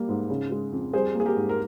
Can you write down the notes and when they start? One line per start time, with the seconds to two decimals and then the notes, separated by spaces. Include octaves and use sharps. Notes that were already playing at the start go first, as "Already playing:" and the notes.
Already playing: G3 A#3
0.08 G#2
0.30 C#3
0.51 G#3
0.72 F2
0.93 G3 G#4 C5
1.15 A#3 G#4
1.26 G4 A#4
1.36 G#2
1.49 A#4